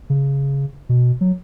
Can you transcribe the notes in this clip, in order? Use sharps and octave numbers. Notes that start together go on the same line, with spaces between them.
C#3
B2
F#3